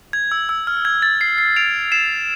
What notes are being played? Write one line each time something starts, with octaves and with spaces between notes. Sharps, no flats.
G#6
E6
E6
F6
G#6
A6
C7
C7
D7 F7
C7 E7